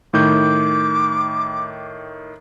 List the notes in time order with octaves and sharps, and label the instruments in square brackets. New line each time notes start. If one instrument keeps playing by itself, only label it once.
[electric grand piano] A2 D#3 G6 [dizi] D6